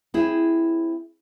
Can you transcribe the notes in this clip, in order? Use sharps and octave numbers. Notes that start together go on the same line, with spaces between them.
C4 E4 G#4